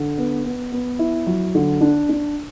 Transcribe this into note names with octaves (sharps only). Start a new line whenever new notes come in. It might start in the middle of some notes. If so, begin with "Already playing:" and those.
Already playing: D3
B3
B3
B3
E4
F#3
D3
D4
D4